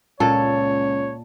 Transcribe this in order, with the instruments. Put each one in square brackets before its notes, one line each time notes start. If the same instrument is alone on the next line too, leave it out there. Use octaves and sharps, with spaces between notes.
[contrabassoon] C#2 [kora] A#2 A4 [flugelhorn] C#5